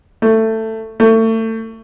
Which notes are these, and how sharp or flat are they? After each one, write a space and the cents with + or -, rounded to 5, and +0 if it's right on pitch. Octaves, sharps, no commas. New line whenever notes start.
A3 +15
A3 +30